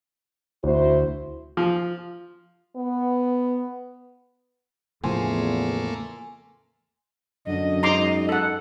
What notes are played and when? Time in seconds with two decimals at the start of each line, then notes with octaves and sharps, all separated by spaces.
0.64 D2 E4 F#4 C5
1.57 F3
2.76 B3
5.04 E2 A2 C#3 F3 A3 A#3 G#5 C6
7.47 F#2 D3 D#5
7.83 G#2 A#5 C6 D6
8.29 A4 F#5